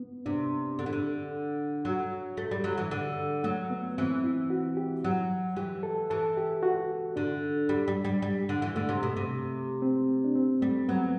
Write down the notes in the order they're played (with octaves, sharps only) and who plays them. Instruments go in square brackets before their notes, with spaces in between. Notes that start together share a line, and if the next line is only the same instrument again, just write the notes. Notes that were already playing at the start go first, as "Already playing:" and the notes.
Already playing: [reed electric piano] B3
[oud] C3 [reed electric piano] D4
[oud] D3
E3
D3
[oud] F#3 [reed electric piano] F#4
[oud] A3
G3
F#3
E3
D3
[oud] F#3 [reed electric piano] A3
[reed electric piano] B3
[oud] E3 [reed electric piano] C4
[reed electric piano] E4
F#4
G4
[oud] F#3
[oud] E3 [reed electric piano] G4
[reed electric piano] A4
[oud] E3 [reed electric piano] A4
[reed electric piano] G4
F#4
[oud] D3 [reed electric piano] D4
[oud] G3
G3
G3
G3
D3
E3
[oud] D3 [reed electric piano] A3
[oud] C3
B2
C3
[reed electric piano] C4
D4
C4
[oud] G3 [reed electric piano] A3
[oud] F#3 [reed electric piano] B3